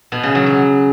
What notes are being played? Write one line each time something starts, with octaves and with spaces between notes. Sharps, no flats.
B2
C#3
F#3
F#3